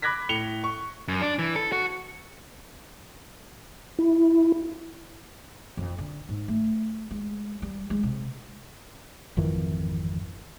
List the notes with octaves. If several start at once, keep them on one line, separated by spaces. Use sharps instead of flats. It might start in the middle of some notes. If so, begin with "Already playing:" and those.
B5 D6 F#6 G#6 A#6 B6
A2 C#7 F7 G7
C#6
F#2
D4
E3
A4
F#4
E4
F2
D3
G#2
A3
G#3
G3
G#3
C3
G#1 F2 D#3 E3